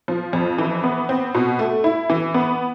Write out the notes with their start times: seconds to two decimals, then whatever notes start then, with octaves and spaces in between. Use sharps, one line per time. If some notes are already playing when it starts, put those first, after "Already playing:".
0.08 F3
0.33 F2
0.58 E3
0.84 B3
1.09 C4
1.35 B2
1.59 A3
1.84 E4
2.10 E3
2.34 B3